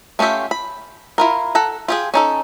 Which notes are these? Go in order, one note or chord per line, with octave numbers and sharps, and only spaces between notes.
A3 C#4 F4 G4 E5
B5
E4 F4 A#4
A4 F#5 A#5
F4 G4 G#4
C#4 D#4 A4